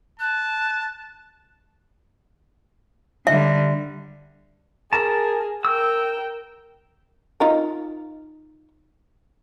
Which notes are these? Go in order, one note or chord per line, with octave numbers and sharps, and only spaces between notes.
A5 F#6
D3 G3 E5
G#4 A#4 A5
A#4 G5 E6
D#4 F4 A#4